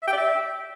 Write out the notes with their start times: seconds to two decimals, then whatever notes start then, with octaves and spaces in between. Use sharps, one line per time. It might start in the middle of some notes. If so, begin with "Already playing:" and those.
0.02 E5
0.08 G5
0.13 D5
0.18 E5